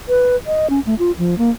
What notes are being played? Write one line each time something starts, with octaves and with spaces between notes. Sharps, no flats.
B4
D#5
C#4
A3
F4
F3
A#3